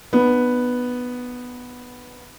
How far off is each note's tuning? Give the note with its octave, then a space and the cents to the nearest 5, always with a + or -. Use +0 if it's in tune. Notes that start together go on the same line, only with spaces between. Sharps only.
B3 +0 D4 +45